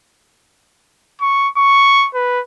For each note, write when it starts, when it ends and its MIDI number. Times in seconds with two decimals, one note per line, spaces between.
1.21 1.48 85
1.57 2.08 85
2.14 2.40 71